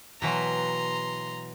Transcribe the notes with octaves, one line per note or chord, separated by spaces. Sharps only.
B2 E3 F#3 A#5 C6